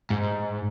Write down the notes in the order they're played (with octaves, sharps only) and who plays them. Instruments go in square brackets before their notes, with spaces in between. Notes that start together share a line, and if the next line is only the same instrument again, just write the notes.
[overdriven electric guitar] G#2